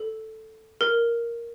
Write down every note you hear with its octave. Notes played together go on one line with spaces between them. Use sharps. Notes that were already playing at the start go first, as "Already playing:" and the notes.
Already playing: A4
A#4